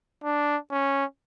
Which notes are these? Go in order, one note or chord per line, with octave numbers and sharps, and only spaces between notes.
D4
C#4